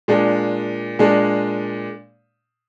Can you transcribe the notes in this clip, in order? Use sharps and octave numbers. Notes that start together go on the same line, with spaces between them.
A#2 G#3 D4
A#2 G#3 D4